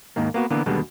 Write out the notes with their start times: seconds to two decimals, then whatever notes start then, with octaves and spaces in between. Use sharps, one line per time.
0.16 D#2 G#2 D#3 A#3
0.34 A#3 B3 F#4
0.50 D3 E3 A#3 B3
0.66 D#2 B2 D3 G3 G#3 B3